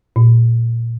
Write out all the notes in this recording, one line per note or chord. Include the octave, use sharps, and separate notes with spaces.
A#2